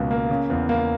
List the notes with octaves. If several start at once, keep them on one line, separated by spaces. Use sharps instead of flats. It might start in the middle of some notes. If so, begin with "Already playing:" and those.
Already playing: C#2 B2 A#3
A#3
C#3
E2
A#3